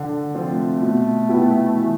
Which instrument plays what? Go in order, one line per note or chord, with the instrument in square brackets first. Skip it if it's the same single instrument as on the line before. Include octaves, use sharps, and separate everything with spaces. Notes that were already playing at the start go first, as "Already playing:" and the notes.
Already playing: [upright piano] D3
F3 C4 F4
[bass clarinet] A3
[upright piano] B2
B3 E4 G4
E3